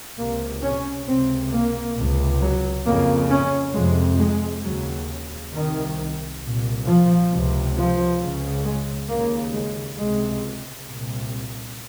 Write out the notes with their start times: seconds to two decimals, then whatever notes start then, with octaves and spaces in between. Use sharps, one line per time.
0.18 C#2 C3 A#3
0.62 C#4
1.07 C#2 C3 C4
1.51 A#3
1.96 C#2 C3
2.41 F#3
2.85 F2 C#3 A#3
3.30 C#4
3.74 F2 C3 G#3
4.19 G#3
4.64 D#2 C#3 F#3
5.52 C2 C3 D#3
6.42 C2 A#2
6.86 F3
7.31 C#2 C3
7.76 F3
8.20 C#2 C#3
8.64 G#3
9.08 D#2 C#3 A#3
9.53 G#3
9.98 C#2 C3 G#3
10.87 C2 A#2